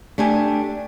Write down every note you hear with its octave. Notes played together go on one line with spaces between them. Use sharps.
A3 D4 G4 G#5